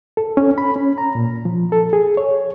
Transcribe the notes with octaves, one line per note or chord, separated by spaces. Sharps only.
A4
C#4
B5
C#4
A#5
A#2
F3
A4
G#4
C#5